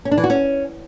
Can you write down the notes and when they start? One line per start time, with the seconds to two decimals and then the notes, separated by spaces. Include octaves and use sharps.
0.05 C#4
0.11 D4
0.18 E3
0.24 F#4
0.30 C#4